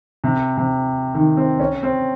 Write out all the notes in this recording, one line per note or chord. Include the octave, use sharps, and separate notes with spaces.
C3
C3
D#3
C4
C#4
C4